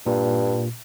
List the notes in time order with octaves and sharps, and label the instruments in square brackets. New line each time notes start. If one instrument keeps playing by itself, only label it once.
[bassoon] G2 [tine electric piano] A#2